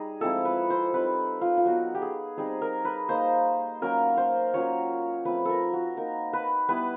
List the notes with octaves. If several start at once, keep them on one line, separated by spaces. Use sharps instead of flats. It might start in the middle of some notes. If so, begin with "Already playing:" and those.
Already playing: G3 D#4 G#4
F3 G#3 C4 E4 A4
B4
C5
G3 C4 D#4 B4
F4
F4
F#3 B3 D#4 F#4
G4
G#4
G3 C4 D#4 G#4
A#4
B4
A#3 D#4 C5
F#3 A#3 C#4 A#4
C5
F#3 A#3 C#4 F4 C#5
F3 A3 C4 B4
A4 A#4
F#4
A#3 D#4 A#4
B4
G3 B3 E4 B4